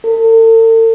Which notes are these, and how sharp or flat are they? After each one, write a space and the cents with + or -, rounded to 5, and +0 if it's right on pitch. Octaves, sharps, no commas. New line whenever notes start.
A4 +45